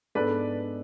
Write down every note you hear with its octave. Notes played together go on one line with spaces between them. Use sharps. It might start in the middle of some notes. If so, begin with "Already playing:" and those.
G#2 G#3 B3 D4 A4 B4 D5